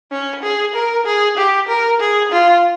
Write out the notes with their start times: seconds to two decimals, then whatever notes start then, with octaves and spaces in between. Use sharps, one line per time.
0.11 C#4
0.43 G#4
0.74 A#4
1.06 G#4
1.37 G4
1.68 A#4
2.00 G#4
2.32 F4